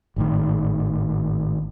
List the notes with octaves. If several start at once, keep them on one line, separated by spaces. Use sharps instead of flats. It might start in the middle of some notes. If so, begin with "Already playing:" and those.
G#1 A2 D#3